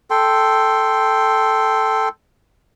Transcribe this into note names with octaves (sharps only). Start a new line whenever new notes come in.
A4 G5 C6